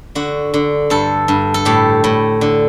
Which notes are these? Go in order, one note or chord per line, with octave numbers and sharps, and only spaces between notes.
D3 F#4
D3
G2 A4
G2
A4
A2 G4
A2
D3